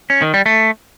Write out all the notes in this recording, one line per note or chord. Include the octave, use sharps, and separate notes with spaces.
C#4
D#3
G3
A3